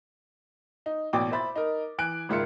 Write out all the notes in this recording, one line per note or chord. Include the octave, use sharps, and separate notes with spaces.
D#4
A1 B2 D5 G5 D6
C5 E5 B5 A6
D#4 A#4
E3 G#5 F#6 D7
G#1 C#2 F4 A#4 E5 C#7